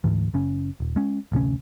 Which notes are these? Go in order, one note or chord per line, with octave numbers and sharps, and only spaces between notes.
D2 G#2 E3
F#1 C#3 C#4
D#1
G#3 C#4
A1 D2 C3 C#4